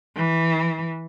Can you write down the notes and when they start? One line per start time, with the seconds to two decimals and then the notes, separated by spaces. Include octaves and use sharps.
0.16 E3